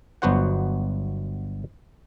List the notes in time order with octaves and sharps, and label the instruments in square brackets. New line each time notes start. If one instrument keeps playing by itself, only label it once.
[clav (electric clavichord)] G1 F#3 B3 F#4 C5 F#5